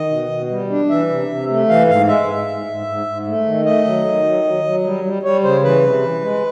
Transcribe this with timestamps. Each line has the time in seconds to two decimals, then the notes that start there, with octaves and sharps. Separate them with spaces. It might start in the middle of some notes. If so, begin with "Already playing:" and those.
Already playing: D#3 D#5
0.11 B2
0.31 B2
0.50 G3
0.70 D4
0.89 E3 E5
1.09 C3
1.29 C3
1.49 A3
1.68 E3 F5
1.88 G#2 F5
2.07 G#3 E5
2.28 G#2
2.47 G#2
2.67 G#2
2.87 G#2
3.06 G#2
3.27 A3
3.45 D#3
3.65 A3 D#5
3.85 F#3
4.05 D#3
4.25 F#3
4.44 F#3
4.64 F#3
4.84 G3
5.04 G3
5.23 G3 C#5
5.43 C#3 C5
5.63 E3 B4
5.82 C3
6.02 E3
6.21 G#3